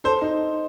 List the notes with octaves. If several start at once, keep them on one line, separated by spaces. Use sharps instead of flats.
A4 C5
D#4